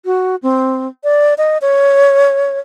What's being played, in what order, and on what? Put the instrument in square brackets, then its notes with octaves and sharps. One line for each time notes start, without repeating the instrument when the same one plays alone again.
[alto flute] F#4
C4
D5
D#5
C#5